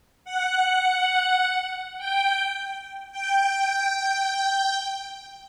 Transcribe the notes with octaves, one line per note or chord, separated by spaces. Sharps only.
F#5
G5
G5